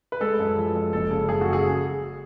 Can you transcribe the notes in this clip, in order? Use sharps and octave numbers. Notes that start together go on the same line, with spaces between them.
B4
G#3 A4
F#2
F3
G#3
F#1 A4
C#3
F#2 G#4
F#4
G#4